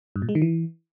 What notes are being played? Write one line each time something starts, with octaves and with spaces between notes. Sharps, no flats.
G2
A#2
G#3
D#3
E3